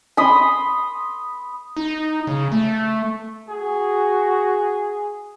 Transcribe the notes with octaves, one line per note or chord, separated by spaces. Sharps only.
B5 C6 D#6
D#4
C#3
A3
F#4 G#4